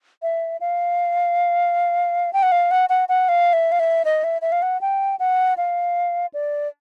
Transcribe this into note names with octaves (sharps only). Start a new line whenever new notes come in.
E5
F5
G5
F#5
F5
F#5
F#5
F#5
F5
E5
F5
E5
D#5
E5
E5
F5
F#5
G5
F#5
F5
D5